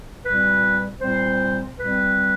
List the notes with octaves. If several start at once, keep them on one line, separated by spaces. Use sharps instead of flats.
A#2 G3 C4 B4
A#2 G3 C4 C5
A#2 G3 C4 B4